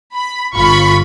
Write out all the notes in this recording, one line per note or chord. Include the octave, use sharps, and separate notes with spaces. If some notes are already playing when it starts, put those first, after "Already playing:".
B5
G1 F4 B5 C#6